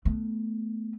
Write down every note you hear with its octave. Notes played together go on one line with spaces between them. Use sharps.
A3 B3